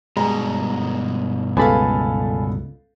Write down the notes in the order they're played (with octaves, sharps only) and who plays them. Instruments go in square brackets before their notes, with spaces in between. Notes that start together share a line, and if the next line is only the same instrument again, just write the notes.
[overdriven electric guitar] G2 B2 [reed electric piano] G#3 [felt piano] A#5
[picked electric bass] C#2 [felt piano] B3 A4 F5 [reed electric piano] G#5 A5 B5